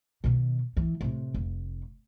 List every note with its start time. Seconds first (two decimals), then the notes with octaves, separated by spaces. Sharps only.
0.24 B2 D#3
0.77 E3
1.01 A2 C3
1.34 F1